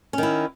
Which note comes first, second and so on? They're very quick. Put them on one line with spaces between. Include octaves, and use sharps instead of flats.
C#4 D#3 E4